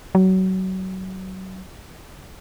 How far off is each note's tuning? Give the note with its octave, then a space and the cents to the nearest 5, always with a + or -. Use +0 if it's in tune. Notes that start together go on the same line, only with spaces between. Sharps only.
F#3 +25